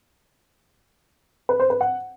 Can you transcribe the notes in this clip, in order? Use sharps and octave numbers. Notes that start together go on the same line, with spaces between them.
B4
C5
B4
F#5